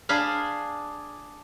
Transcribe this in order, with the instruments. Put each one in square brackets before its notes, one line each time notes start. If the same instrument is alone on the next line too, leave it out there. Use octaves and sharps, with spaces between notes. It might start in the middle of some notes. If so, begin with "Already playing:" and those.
[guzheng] D4 G#4 F5 B5